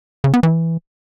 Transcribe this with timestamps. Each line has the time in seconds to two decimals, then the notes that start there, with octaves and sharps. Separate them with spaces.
0.24 C#3
0.34 B3
0.43 E3